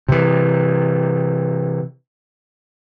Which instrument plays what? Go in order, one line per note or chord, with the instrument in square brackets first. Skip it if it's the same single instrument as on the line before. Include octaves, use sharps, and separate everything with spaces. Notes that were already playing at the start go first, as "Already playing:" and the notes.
[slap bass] C3 E3